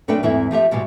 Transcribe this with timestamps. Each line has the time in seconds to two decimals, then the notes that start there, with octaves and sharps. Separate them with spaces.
0.08 F#2 A3 D4 B4 G5
0.23 E2 G#2 E3 C4 E4 E5
0.51 F3 A3 G4 E5
0.71 G#2 B2 E3 G3